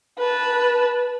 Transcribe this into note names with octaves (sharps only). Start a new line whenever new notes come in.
B4 A5